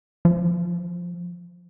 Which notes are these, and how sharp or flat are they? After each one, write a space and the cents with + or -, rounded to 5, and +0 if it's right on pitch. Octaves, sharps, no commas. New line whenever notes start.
F3 +5